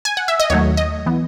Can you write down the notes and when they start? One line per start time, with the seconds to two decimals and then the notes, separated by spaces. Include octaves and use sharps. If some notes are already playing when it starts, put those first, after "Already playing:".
0.05 G#5
0.17 F#5
0.28 E5
0.40 D#5
0.50 D#2 D#3 F#3 A3 C#5
0.77 D#5
1.06 E3 B3